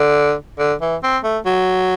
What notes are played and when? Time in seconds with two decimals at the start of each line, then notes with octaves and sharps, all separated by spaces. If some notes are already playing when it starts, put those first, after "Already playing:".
Already playing: D3
0.59 D3
0.81 E3
1.03 C4
1.24 A3
1.45 F#3